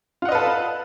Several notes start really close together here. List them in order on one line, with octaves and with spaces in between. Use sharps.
F4 F#5 D#5 B4 A4